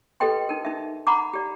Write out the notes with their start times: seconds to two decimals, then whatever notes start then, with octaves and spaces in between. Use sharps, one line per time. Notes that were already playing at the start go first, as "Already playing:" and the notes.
0.20 G4 A4 B4 D#5 G5 C6
0.49 D#4 A#4
0.65 D#4 E5
1.07 F#5 A#5 B5 D6
1.34 G4 D5